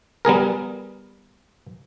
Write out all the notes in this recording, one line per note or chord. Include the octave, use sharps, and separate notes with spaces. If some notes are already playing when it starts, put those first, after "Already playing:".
G3 B3 G#4 A#4